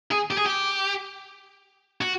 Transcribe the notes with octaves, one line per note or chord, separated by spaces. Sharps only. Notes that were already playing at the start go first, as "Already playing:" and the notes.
G#4
G4
G#4
G4
F#4